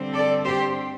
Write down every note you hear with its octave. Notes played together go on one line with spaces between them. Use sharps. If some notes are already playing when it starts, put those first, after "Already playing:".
Already playing: G2 D3 G3 C4
A4 D5
G4 C5